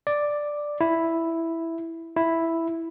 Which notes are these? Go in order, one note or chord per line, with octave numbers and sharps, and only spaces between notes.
D5
E4
E4